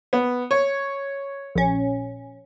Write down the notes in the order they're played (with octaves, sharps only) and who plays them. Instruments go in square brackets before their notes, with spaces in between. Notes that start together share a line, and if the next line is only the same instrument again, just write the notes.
[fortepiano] B3
C#5
[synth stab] A#1 C#4